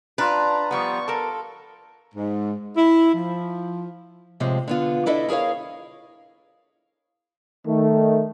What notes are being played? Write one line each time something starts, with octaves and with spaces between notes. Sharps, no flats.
D4 F4 B4 A5 A#5
F3 G3 B3 A#5 C#6
A4 A#4 A5
G#2
E4
F3
A2 C3 F3 G#3
D3 B3 F4
D4 E4 A4 D#5 E5
E4 G#4 A#4 C#5 F5
D#3 A3